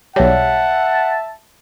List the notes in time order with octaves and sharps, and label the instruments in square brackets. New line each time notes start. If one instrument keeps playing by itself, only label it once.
[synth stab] B1 G3 [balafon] C#5 [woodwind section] E5 A5 [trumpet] F#5